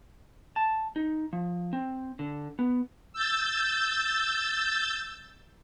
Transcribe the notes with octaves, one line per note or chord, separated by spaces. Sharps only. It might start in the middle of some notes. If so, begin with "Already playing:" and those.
A5
D#4
F3
C4
D3
B3
E6 G6 A6